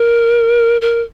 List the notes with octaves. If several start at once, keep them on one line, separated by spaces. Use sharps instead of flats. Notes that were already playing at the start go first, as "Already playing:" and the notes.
Already playing: A#4
A#4